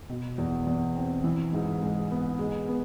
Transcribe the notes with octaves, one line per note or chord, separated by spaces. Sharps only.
B2
E2
E2
C4
E3
G#2
G#3
B3
G#3
B3